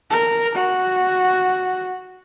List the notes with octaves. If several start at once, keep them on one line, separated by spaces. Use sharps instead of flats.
A#4
F#4